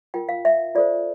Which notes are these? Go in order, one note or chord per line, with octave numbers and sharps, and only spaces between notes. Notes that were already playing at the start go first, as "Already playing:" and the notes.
F4 A#4 G5
F5
E5
F4 A4 C5 D5